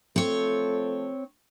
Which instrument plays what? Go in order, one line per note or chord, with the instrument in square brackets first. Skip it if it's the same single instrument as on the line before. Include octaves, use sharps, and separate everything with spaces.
[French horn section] F3 A3 A4 [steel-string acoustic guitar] C4 C#5